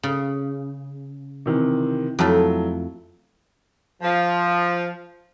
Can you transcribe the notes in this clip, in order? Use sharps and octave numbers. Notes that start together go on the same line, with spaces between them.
C#3
C3 D#3 E3
F2 F#3 A3 E4
F3